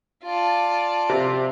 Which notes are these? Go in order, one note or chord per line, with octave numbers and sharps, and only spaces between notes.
F4 D5 A5
C3